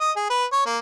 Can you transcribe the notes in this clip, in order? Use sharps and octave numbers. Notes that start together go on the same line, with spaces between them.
D#5
G#4
B4
C#5
A#3